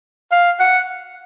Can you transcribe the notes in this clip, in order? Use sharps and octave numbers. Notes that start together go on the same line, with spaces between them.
F5
F#5